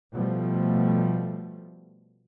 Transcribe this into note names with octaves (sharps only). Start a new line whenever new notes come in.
B2 F3 G3 A3